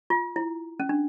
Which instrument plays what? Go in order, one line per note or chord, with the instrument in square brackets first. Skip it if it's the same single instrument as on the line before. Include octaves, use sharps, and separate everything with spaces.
[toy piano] F4
E4
C#4
D4